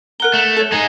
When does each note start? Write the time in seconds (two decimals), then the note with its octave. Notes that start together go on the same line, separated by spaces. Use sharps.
0.20 A#4 F#5 A#5 F#6 G7
0.34 A3 E7
0.57 A4 C#5
0.72 G#3 D#4 A#5